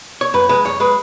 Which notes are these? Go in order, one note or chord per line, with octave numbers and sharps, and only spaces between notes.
C#5
F#2 B4
G#3 B4
F#2 C#5
G#3 B4